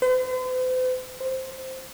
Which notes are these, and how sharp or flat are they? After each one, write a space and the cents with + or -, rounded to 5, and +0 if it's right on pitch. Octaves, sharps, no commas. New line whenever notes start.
C5 -45
C5 +0